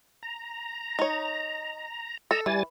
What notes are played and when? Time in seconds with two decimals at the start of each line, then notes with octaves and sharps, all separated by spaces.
0.23 A#5
0.99 D#4 C#5
2.31 A4 D#5 A#5 E6
2.46 E3 G3 G#5 A6